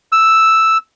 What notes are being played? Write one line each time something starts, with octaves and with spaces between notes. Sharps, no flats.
E6